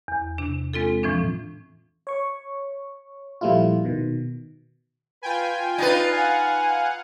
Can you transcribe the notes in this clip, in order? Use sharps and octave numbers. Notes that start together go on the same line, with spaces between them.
E2
C3 D4
G#3 C4 F4 A4
A2 E3 F3 C4 D4
C#5 C#6
A#2 F3 G3 A3 E4 F4
B2 D#3
F4 B4 G5 G#5
D4 D#4 F4 B4
F5 F#5 G#5